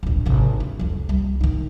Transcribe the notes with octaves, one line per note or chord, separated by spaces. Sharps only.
D1 A#1
G#1 C3
E4
C2 F2
C2 G3
D#3 D#4